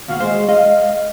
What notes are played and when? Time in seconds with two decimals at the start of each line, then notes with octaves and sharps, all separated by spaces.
0.08 D#2 A#2 F#4 F5
0.20 G#3 C5
0.49 D#5 F5